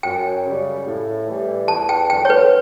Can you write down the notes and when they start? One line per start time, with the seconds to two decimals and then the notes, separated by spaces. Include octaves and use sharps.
0.03 F#2 G5
0.45 C#3 G3
0.86 A2
1.27 E3 G3
1.68 E2 A5
1.89 G5
2.09 D3 F#3 G5
2.25 C#5
2.30 B4